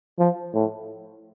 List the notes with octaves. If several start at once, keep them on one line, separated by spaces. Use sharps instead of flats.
F3
A2